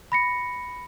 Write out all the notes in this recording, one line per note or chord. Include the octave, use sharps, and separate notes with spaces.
B5 A#6 C#7